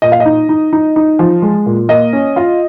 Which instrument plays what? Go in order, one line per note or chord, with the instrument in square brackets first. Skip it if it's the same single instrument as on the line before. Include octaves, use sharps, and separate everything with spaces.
[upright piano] A#2 D#5
F5
D#5
D#4
D#4
D#4
D#4
F3
G#3
A#2
A#3 D#5
C#4
F4